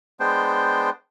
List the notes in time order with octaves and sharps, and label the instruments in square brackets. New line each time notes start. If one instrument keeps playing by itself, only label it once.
[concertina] G#3 B3 D4 C5 G5